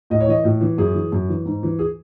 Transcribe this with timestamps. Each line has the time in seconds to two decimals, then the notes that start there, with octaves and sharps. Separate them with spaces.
0.10 A2 D#5
0.20 C#5
0.27 E3 D#5
0.44 A2
0.61 E3
0.78 F#2 G#4
0.94 E3
1.12 F#2
1.29 E3
1.46 G#2
1.63 E3
1.79 G#4